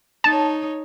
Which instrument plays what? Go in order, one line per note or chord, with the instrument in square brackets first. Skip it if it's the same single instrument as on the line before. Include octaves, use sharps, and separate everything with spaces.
[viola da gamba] D#4 C#5 [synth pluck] A5